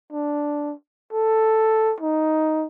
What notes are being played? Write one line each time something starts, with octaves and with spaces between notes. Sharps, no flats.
D4
A4
D#4